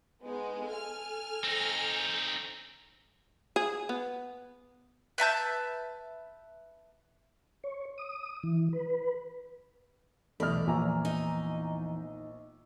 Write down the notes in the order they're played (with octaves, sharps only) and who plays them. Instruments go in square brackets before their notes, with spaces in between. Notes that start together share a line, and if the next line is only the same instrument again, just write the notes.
[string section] G#3 B3 D#4
A4 G#5 F6
[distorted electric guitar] C4 D#4
[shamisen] G#4
B3
[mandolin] B4 E5 A5 G6
[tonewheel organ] C#5
D#6
E3
B4
[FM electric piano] B1 D#5 B5 [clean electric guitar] E2 [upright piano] A3 F6 [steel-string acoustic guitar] D5
[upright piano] A#1 [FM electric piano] F3 G#5 A#5
[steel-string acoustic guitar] D#4